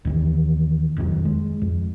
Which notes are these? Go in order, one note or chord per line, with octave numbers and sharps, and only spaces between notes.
D#2 D#3 E3
E1 F2 D#3 F#3
G#3
F2